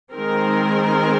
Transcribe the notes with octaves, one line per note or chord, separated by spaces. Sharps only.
D#3 G#3 C4 A#4